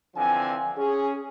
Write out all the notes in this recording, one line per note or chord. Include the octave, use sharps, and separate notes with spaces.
D3 E3 F3 C4 G#5
C#4 G#4